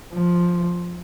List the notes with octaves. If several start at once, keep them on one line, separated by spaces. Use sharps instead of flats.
F3